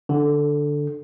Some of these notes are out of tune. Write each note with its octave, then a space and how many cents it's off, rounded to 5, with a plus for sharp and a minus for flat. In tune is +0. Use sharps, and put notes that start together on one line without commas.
D3 +0